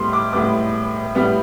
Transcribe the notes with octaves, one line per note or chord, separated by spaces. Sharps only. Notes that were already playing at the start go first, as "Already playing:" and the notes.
Already playing: A2 G3 B3 C6
D6
A2 G3 B3 D6
A2 G3 B3